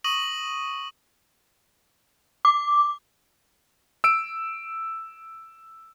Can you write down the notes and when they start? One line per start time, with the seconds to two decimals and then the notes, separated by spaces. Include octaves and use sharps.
0.04 C#6 D#6 A#6 D#7 F#7
2.45 D6
4.04 E6 D7